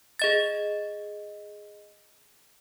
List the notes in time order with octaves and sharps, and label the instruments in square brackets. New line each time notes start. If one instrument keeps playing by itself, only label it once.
[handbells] G#4 D#5 A6